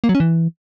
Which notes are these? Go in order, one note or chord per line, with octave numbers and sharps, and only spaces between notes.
A#3
F#3
C#4
E3